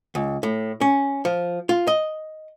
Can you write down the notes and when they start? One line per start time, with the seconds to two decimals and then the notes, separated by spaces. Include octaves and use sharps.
0.15 C#2
0.43 A2
0.81 C#4
1.25 F3
1.69 F4
1.87 D#5